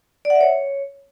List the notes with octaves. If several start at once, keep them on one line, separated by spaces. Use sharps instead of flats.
D5
F#5
E5
C#5